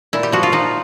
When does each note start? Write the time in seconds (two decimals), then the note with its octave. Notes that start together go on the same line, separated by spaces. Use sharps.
0.13 A#2 E4
0.23 G4
0.32 F3 F#4
0.43 F4
0.52 F3 D#4